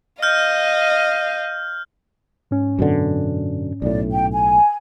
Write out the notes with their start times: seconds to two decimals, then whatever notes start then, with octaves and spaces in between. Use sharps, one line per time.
0.23 D#5 F5 F6 G6
2.51 G#2 C#4
2.79 F#2 B2 D3
3.82 B1 A2 D5
4.12 G5
4.32 G#5